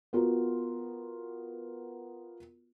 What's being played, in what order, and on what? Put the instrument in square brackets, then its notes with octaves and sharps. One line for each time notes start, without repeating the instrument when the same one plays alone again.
[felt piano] B3 F4 F#4 A#4